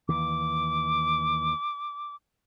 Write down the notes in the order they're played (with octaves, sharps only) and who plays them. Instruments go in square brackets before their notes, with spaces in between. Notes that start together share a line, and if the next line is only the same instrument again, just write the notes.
[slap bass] D#2 E3 [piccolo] D6